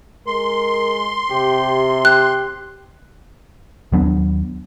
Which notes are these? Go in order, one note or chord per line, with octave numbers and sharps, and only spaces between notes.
G#3 A#4 C6
C3 G4
G4 F#6
D#2 F#3 B3 D4